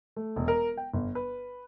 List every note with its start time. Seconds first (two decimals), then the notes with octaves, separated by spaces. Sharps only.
0.16 A3
0.36 E1
0.48 A#4
0.77 G5
0.94 G1
1.15 B4